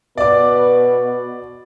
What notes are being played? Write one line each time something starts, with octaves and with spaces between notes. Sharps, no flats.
B2 B4 D5 D6